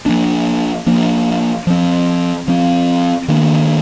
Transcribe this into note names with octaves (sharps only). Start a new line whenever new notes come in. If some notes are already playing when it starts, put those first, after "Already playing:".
F3 A#3 D4
F3 A#3 D4
F3 C4
F3 C4
D#3 A#3 D4